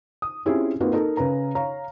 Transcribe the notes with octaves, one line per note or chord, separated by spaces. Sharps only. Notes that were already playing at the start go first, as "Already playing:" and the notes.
D#6
C4 C#4 E4 F4 G4 G#4
A#3 C4 D#4 F4 F#4 B4
D#4 A4 A#4
C#3 C#4 B4 A#5
C#5 F5 A#5